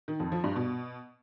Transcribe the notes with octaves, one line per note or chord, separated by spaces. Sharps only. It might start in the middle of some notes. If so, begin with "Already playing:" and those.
D#3
F2
F3
G2
B2